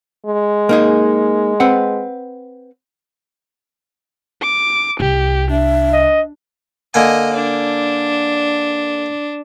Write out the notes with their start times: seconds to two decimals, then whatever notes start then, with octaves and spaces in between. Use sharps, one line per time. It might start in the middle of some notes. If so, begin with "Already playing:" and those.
0.26 G#3
0.69 A#3 D#4 G#4
1.60 C4 B4 F#5
4.41 D6
5.00 C2 G4
5.51 D4 E5
5.93 D#5
6.94 D3 A#3 D#5 G#5
7.34 D4